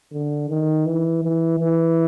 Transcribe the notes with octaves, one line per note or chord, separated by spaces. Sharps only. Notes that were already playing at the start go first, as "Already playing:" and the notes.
D3
D#3
E3
E3
E3